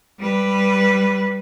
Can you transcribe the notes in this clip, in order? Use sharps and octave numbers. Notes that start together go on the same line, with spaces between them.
G3 B4